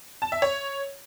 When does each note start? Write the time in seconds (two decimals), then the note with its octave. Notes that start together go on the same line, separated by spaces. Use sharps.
0.22 A5
0.32 E5
0.42 C#5